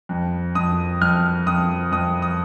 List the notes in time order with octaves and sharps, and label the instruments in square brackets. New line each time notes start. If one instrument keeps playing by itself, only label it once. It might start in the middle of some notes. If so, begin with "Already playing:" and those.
[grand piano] F2
F2 D#6
F2 F6
F2 D#6
F2 D#6
D#6